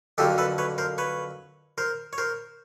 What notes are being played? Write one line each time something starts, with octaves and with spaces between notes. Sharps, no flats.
F2 D3 F#3 A#3 G4 A4
A4 B4
B4 C#5
A#4 C5
B4 C#5
A#4 C5
C#5
A#4 C5